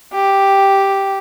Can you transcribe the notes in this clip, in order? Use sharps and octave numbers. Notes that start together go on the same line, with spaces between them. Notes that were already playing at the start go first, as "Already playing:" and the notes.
G4